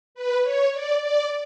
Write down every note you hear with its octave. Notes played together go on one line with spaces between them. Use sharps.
B4
C#5
D5
D5